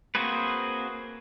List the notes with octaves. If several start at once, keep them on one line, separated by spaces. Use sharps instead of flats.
A#3 C4 F#4 G#4 B4